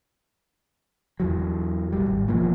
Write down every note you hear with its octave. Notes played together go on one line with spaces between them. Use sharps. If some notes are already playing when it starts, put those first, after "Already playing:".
E2 E3 F#3
A#1 D#2 G3
G#1
E1 E2 F3 A#3